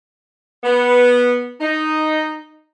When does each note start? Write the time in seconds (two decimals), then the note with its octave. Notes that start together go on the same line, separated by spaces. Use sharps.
0.64 B3
1.60 D#4